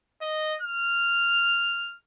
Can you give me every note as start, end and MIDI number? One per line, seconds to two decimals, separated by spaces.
0.22 0.54 75
0.62 1.98 89